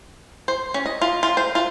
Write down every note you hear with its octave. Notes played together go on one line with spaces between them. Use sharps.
C5
C#4
D#5
F4
F4
C5
F4